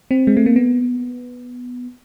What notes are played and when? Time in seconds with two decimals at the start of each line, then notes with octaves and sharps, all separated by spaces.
0.11 C4
0.27 G#3
0.37 A3
0.46 A#3
0.56 B3